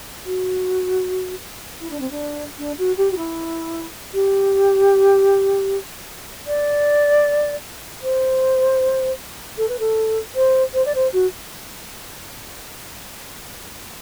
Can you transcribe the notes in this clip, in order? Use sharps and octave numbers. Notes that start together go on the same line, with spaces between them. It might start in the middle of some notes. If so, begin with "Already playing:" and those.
F#4
E4
D4
C4
D4
D4
F#4
G4
F#4
E4
G4
D5
C5
A4
B4
A4
C5
C5
D5
C5
F#4